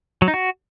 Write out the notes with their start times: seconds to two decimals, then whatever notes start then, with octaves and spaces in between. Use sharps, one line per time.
0.22 F#3
0.28 D#4
0.34 F#4